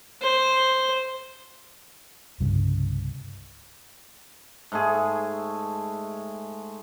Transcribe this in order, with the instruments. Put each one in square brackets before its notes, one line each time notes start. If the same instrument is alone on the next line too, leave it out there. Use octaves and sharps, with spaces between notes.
[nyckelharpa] C5
[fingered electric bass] C2 G2 C#3 G3
[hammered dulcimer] G#2 A3 G#4